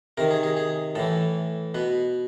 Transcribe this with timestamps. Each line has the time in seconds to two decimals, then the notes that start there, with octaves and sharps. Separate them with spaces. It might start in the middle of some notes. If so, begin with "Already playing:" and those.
0.17 C3 D#3 A#4
0.31 G#4
0.43 G#4
0.57 G#4
0.95 A2 E3 A4
1.74 B2 B4